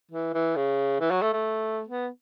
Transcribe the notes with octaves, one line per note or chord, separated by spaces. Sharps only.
E3
E3
C#3
E3
F#3
A3
A3
B3